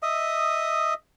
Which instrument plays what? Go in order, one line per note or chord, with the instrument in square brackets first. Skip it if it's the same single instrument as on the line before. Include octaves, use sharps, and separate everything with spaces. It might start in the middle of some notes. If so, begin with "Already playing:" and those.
[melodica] D#5 E5 D#6